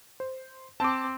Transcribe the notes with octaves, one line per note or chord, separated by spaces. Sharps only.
C5
C4 A5 D6